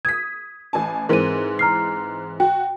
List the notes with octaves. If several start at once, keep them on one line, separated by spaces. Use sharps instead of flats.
D#6 G#6 B6
A1 G#5 A5
G#2 E3 C4 A#4 D#7
A#5 F6 C7
F#4 G5